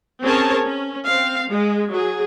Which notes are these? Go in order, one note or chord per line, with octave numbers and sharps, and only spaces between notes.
C4 C#4 G#4 A#4 C#5 A5
C#4
C4 F5
G#3
F#3 G#4